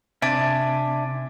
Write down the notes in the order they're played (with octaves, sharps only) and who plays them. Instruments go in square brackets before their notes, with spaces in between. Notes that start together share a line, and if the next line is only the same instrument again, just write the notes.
[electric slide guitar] C3 [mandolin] D4 [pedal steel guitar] E5 G#5 D6